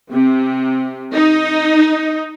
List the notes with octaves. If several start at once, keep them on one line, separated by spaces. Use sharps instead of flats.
C3
D#4